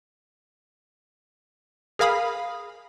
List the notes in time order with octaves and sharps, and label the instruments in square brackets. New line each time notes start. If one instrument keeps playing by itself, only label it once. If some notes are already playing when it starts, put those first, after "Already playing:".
[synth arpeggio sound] G#4 A#4 F5 B5 D#6